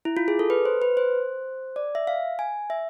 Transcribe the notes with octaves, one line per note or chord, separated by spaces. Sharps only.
E4
F4
G#4
A4
B4
C5
B4
C5
D5
E5
F5
G#5
E5